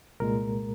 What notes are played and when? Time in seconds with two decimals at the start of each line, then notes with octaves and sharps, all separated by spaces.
0.20 C2 A#2 G#3 A#4